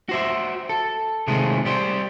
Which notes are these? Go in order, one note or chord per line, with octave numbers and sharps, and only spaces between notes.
F#4 C5 E5
A4
C3 D#3 G#3 A3 G#4 C5
G3 G4 C5